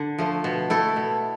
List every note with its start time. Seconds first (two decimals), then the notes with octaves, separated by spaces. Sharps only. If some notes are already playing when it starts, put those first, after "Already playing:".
Already playing: D3
0.18 F3 A3
0.44 B2
0.70 A3 E4 A4
0.96 B2